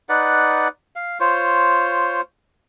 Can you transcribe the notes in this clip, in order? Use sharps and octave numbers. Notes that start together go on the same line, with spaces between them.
D#4 B4 D5 F#5
F5
F4 C5 C#5